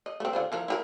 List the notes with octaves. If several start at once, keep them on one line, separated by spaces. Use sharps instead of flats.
D#5
A3 C4
D3 F4 C5
E3 F3 A#4
E4 G4 A#4